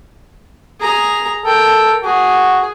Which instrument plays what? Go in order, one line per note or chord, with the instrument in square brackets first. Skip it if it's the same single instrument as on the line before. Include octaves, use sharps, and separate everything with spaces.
[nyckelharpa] G#4 A#5
[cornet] A4 [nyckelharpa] A#4 G5
[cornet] F#4 [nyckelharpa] G#4